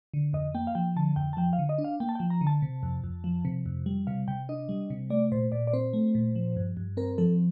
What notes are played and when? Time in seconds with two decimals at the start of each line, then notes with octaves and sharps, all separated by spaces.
0.14 D3
0.33 F2 D#5
0.54 A#3 G5
0.67 F5
0.75 F3 G5
0.96 D3 A5
1.16 F2 G5
1.33 A5
1.37 F3 G5
1.53 F5
1.59 D3
1.69 D#5
1.78 D4
1.84 F5
2.00 A#3 G5
2.09 A5
2.15 F3 G5
2.30 A#5
2.41 D3
2.47 A5
2.62 C3
2.83 F2
3.04 F2
3.24 F3
3.45 C3
3.66 F2
3.86 G3
4.07 C3 F5
4.28 C3 G5
4.49 D4 D#5
4.69 G3
4.90 C3
5.10 A3 D5
5.32 A#2 C5
5.52 A#2 D5
5.67 D5
5.73 C4 C5
5.93 A3
6.15 A#2
6.35 F3
6.56 G2
6.77 G2
6.97 C4 A#4
7.18 F3 A4